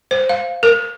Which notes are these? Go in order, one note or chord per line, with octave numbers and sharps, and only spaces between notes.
C5
F5
A#4